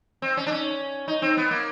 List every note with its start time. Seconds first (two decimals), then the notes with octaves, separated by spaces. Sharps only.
0.22 C4
0.37 C#4
0.47 D4
0.52 C#4
1.08 D#4
1.22 C4
1.37 B3
1.51 A#3